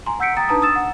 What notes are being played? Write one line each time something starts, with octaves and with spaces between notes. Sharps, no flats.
G#5 A#5 C6
F#5 E6 G6 B6 C#7 D7
G5 A#5 D#6 A6
D4 D#4 B4 A5 A#5 D#6
D#6 E6 A6 E7
F#5